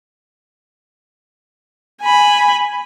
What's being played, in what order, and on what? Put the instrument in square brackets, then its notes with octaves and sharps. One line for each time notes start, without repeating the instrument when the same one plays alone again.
[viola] G#5 B5